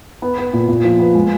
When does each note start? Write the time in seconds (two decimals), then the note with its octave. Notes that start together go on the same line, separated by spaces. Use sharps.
0.22 B3
0.38 B3
0.53 A#2
0.68 A#2
0.84 F3
1.00 B3
1.15 G#3